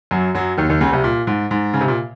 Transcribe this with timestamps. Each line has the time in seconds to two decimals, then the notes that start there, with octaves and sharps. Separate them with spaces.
0.11 F#2 F#3
0.35 F#2 F#3
0.57 D#2 D#3
0.70 D#2 D#3
0.81 C#2 C#3
0.92 C2 C3
1.04 A#2
1.27 G#2
1.51 G#2
1.73 C#3
1.81 C3
1.88 A#2